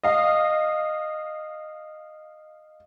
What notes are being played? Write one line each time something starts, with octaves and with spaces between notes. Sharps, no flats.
D#5 F5